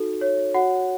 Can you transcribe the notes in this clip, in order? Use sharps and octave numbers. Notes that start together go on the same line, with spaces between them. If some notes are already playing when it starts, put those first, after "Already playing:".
Already playing: D#4 F#4 A4
C#5
F#4 F#5